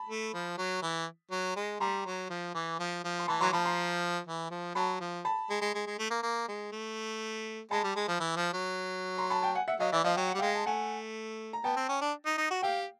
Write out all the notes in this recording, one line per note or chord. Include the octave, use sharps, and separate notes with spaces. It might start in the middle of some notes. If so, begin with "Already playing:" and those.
Already playing: A5 B5
A3
F3
F#3
E3
F#3
G#3
G3 A#5 C6
F#3
F3
E3
F3
F3
C6
E3 A5 B5
F#3 A#5 C6
F3 A5 B5
A#5 C6
E3
F3
F#3 A5 B5
F3
A5 B5
G#3
G#3
G#3
G#3
A3
A#3
A#3
G#3
A3
G#3 A5 B5
G3
G#3
F3
E3
F3
F#3
A#5 C6
A5 B5
G5 A5
F#5 G#5
E5 F#5
F#3 D#5 F5
E3 D5 E5
F3 D#5 F5
F#3 G5
F#5
G3
G#3 F5 G5
A5
A3 F#5 G#5
A#5
B3 G5 A5
C4
C#4
D4
D#4
D#4
F#4
G4 F5 G5